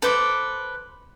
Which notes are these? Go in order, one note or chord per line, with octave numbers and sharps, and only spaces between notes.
A4 B4 C5 D6